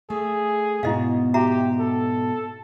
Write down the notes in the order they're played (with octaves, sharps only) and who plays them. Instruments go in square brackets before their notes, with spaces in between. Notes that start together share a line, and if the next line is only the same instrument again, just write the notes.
[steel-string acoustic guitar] A3 [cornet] G#4
[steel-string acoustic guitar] G#2 B2 [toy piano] E4 D#5 F5
[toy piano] F#4 E5 A#5 [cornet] G4
[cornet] A4